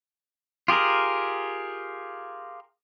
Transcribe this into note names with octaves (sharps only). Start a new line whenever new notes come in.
F4 G4 G#4 A#4